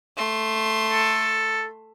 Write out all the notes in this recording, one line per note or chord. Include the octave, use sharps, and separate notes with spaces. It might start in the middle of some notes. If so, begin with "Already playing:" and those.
A3 C6
A4